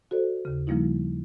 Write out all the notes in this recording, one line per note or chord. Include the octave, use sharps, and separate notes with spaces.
F#4 A4 C5 D5
D#2 C#3
C#3 F3 G3 A#3 D#4 E4